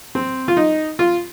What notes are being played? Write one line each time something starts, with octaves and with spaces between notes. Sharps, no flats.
C4
F4
D#4
F4